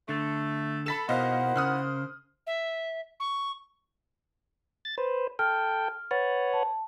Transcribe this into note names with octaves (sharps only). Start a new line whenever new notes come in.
D3 A3
A4 B5 B6 E7
D#2 B2 E4 A#4 C5 D#5 F5 F#5
C#3 D#6 F6 F#6
E5
C#6
A6
B4 C5
A4 G5 F6
B4 C#5 F#5 A6
A5